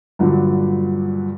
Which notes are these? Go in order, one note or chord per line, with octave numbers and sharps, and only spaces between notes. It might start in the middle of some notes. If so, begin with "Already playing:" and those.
G2 A#2 D3 F#3